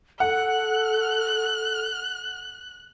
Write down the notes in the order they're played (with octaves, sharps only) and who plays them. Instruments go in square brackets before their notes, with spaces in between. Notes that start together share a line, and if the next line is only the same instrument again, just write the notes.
[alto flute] A4 [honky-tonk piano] F#5 [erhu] F#6